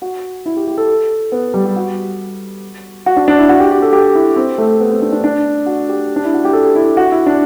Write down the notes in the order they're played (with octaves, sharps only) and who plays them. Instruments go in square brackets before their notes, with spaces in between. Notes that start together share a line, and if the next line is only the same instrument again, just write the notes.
[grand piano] F#4
E4
G4
G4
A4
B3
G3
G4
F#4
F#4
D4
D4
E4
F#4
G4
G4
A4
G4
E4
C4
A3
B3
C4
D4
D4
D4
F#4
G4
D4
E4
F#4
G4
A4
E4
F#4
E4
D4